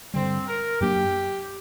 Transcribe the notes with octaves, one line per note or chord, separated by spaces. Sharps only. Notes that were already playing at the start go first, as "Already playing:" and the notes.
G2 D3 G3 C4
A#4
F#2 F#3 A#3 D4 G4